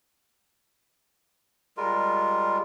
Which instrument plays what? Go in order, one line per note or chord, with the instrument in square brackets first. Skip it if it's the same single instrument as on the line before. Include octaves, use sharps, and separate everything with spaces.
[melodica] G3 G#3 F4 A#4